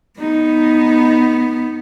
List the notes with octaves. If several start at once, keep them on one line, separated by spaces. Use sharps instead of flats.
B3 D#4